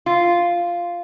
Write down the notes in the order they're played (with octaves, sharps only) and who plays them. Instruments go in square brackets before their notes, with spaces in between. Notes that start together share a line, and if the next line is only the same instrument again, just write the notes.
[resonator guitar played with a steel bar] F4